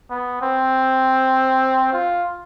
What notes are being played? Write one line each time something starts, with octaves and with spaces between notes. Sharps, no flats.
B3
C4
F4